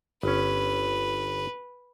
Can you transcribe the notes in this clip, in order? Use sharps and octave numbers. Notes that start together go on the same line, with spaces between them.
G1 C#4 B4